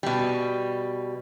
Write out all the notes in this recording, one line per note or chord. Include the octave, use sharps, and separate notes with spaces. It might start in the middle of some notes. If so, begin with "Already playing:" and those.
B2 G3